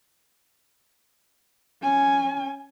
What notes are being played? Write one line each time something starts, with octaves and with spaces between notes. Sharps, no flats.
C#4 G#5